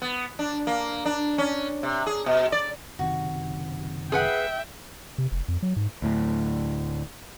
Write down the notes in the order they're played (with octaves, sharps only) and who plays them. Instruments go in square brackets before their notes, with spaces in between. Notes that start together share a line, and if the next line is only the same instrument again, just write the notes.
[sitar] B3
D4
A#3
D4
C#4
C3
G#4
B2
D5
[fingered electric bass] F#1 C3 D#3 [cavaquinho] F#4
[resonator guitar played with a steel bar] G#4 B4 F#5 [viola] E5 G5
[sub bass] C3
F1
F2
F#3
G#2
[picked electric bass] D2 A2